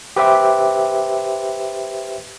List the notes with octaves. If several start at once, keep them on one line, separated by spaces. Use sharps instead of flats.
G4 B4 C5 E5 G5